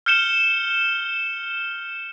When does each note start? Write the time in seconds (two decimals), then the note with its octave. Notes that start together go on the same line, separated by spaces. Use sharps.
0.06 F6 G6 C#7 E7 G7